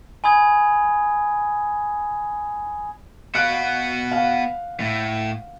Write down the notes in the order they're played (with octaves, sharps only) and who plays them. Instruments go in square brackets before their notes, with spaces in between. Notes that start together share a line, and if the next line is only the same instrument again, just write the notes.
[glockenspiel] G#5 B5 D#6 G#6
[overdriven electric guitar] B3 F#4 [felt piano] F5 F#6 D7
[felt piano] F5 F#5
[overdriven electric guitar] A2